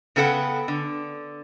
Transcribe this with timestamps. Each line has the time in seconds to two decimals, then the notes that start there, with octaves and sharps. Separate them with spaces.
0.16 C#3 B3 A4 F#5 G5
0.68 D3